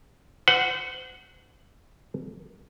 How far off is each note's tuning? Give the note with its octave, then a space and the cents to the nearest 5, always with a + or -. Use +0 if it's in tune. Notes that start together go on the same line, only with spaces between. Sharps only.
C5 -35 F#5 +0